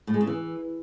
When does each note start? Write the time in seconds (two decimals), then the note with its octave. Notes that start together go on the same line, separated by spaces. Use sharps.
0.07 A2
0.14 G#3
0.21 C#3
0.27 E3